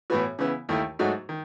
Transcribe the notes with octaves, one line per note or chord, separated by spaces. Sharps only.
A2 E3 B3 F#4
C#3 E3 B3 E4
D#2 D#3 A3 E4
G#2 F#3 A3 D#4 F#4
D#3